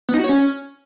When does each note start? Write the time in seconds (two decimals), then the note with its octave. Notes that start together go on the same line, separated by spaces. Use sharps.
0.09 B3
0.14 D#4
0.19 F#4
0.24 C#5
0.29 C#4